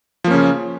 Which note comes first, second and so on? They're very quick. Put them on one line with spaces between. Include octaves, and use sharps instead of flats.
F3 A#3 C#4 C#3